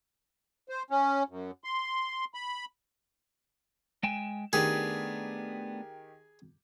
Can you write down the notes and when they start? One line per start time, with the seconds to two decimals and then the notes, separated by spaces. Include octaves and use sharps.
0.69 C5
0.90 C#4
1.29 F#2
1.64 C6
2.34 B5
4.03 G#3 G5 G#5 E7
4.53 D#3 A3 B3 D4 G4 G#4